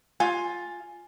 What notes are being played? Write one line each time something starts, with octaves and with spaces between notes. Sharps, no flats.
F4 G#5